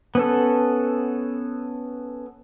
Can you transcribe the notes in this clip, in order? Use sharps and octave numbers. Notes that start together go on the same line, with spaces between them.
B3 C#4 A4